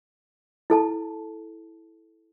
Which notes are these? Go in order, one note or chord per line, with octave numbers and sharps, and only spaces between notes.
E4 A4 A5